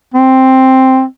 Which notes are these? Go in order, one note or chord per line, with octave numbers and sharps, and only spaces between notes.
C4